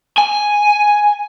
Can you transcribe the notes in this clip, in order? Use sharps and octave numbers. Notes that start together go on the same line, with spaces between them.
G#5